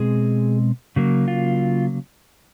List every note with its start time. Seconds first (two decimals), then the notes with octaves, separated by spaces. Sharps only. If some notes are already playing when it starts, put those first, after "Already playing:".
Already playing: B2 G#3 C4 G#4
0.96 C#3 F#3 A#3
1.28 F4